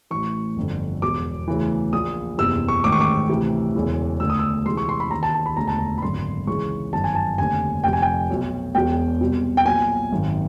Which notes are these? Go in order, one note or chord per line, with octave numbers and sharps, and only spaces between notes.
A1 A2 E3 C#6
G1 F2 D3
E1 E2 B2 D6
D2 C#3 E3
A#1 A#2 D#6
F#1 E2 C3 E3 E6
C#6
A1 G#2 D#3 D6
C#6
D6
D2 C3 E3
E1 E2 C#3 E3
D2 D3 E6
D#6
E6
C#2 C3 E3 C6
C#6
C6
B5
D#2 D#3 A#5
A5
A5
B5
E1 D2 D3 A#5
A5
A#5
B5
G#1 F#2 D3 C6
C#2 C#3 E3 C#6
G1 F#2 D#3 A5
G#5
A5
F1 D#2 D3 G#5
F1 F2 C3 G5
G#5
G5
B1 B2
E1 E2 B2 G5
C2 B2
G5
B1 A#2 G#5
G#1 F#2 D#3